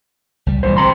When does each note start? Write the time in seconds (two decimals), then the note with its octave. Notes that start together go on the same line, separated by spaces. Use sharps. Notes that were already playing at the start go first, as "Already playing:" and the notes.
0.46 C#2 G3
0.63 B1 G2 A#2 E3 C5
0.77 C4 A#5 C6